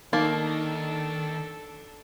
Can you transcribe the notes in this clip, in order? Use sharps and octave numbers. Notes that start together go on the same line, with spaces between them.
D#3 A#3 D4 D#4 A4